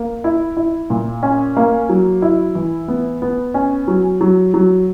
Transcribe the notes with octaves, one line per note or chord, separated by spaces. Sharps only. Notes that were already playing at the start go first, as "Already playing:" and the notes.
Already playing: A#3
E4
E4
A#2
C#4
A#3
F#3
E4
E3
B3
B3
C#4
F#3
F#3
F#3